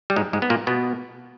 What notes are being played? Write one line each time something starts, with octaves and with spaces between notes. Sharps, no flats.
G3
G#2 G#3
G#2 G#3
B3
A#2 A#3
B2 B3